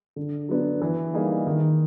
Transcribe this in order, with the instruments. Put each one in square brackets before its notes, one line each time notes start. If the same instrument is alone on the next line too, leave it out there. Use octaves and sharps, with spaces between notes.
[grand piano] D3
F#3 B3 D4
E3
G3 A#3 D#4 G#4
D#3